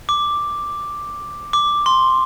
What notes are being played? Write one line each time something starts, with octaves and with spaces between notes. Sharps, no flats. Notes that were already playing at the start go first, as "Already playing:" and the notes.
D6
D6
C6